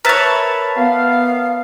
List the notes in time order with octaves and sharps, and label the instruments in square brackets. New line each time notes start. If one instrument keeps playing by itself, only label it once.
[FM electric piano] A#4 E5 A5 [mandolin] B4 C#5
[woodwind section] B3 F5